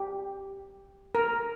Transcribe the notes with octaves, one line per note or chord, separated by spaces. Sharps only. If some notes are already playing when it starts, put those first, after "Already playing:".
Already playing: G4
A#4